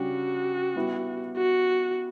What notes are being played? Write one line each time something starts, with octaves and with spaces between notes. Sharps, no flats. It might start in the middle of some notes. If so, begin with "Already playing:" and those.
Already playing: C#3 G3 D4 F#4
G3 B3 E4
F#4